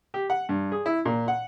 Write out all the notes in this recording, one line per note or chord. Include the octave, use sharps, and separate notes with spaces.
G4
F#5
G2
G#4
E4
A#2
F#5